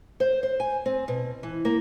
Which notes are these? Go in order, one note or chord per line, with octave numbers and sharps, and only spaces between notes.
C5
C5
G#5
C4
B2
E3
A#3